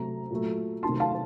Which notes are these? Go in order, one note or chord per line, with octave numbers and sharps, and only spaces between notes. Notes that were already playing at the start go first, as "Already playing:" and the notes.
Already playing: C3 F#3 A3 A#5
A#2 F#3 A3
C3 D#3 F#3 A3 A5 C6
F5 A5